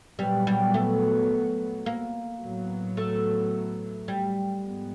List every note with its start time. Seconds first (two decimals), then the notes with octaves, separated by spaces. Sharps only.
0.19 A#2 F#3 G3 B3
0.47 G3
0.74 A3
1.86 A#3
2.41 A2 F#3 B3
2.97 A3
4.08 G3
4.64 G#2 F3 G#3 B3